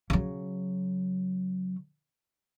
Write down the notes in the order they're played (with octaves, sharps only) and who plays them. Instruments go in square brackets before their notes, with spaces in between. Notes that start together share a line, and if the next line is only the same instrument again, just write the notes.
[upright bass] C#3 F#3